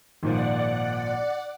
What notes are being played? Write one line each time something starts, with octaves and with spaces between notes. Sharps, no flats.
G#1 A#2 F3 D5 F#5